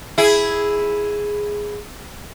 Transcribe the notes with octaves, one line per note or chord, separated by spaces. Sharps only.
E4 G#4